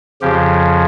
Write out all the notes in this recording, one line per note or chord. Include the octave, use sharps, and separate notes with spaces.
F2 C#3 F3 G4